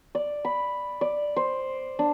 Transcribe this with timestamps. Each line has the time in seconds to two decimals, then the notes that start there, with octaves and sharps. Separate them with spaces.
0.15 D5
0.45 B5
1.01 D5
1.37 C5
1.99 D4